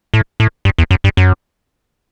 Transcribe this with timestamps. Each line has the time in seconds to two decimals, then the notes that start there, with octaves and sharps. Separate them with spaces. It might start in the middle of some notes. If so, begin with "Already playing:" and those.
0.14 A2
0.40 A2
0.65 G2
0.78 E2
0.91 F#2
1.04 G2
1.17 F#2